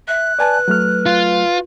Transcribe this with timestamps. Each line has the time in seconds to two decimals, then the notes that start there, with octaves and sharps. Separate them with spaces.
0.08 E5 F#6
0.39 B4 D5 G#5 A5
0.68 F#3 A3 F6
1.06 F4